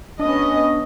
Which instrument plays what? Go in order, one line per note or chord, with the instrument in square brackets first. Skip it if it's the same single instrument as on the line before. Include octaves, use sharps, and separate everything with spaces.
[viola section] B3 C#4 D#5 [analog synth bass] D4